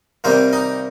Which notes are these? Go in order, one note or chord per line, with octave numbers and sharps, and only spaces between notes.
C3 D#3 G3 A#3 C4 C5
D#4 D#5